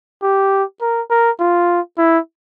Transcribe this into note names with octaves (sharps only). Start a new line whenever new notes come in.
G4
A#4
A#4
F4
E4